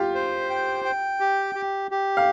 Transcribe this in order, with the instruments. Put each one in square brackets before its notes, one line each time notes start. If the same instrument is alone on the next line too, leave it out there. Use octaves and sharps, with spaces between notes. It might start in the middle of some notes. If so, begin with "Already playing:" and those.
Already playing: [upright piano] F4 G4
[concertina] C5
G5
G5
G4
G4
G4
[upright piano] F5